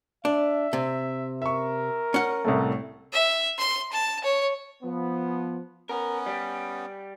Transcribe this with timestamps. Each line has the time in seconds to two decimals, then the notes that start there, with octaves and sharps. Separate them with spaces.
0.25 D4 E5
0.73 C3
1.42 A#4 E5 C#6
2.14 C#4 F#5
2.45 C2 A2 A3
3.13 E5
3.58 C6
3.92 A5
4.24 C#5
4.83 F3 B3
5.89 B3 C#4 A#4
6.26 G3